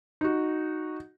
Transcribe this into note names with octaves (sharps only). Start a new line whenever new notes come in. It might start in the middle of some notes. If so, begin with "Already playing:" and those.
D#4 F#4